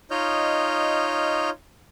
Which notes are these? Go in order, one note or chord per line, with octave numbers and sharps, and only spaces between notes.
D#4 F4 C#5 D#5 F6 G6